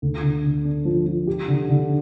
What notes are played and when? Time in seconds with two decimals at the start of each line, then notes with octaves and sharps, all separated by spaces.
0.02 D2
0.23 D3
0.44 D3
0.65 D4
0.85 F3
1.06 F3
1.27 G4
1.48 D3
1.69 D3